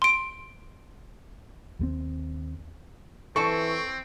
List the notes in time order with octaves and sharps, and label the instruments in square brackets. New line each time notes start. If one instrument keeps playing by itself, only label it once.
[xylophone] C6 D7
[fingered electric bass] D#2 G3 C4
[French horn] E3 [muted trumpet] C4 [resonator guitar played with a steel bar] A4 A5 [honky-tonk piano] C#6